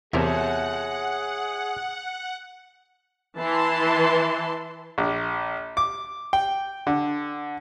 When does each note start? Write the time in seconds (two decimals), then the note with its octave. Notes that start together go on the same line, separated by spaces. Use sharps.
0.13 E2 C3 F4 G#4 A#4 C#5 E5 F#5
3.39 E3 A5 C6
4.98 A#1
5.77 D6
6.33 G5
6.87 D3